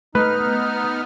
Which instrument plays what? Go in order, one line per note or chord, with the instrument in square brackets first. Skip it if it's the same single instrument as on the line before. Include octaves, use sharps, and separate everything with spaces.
[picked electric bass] A3 [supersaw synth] B3 [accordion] D#4 F6 [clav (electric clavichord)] B4